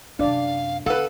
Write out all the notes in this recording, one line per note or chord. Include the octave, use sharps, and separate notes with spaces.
F#2 C3 D4 D5 F5
D3 B3 A4 B4 F5 F#5